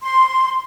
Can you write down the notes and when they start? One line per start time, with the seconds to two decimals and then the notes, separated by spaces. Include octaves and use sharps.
0.02 C6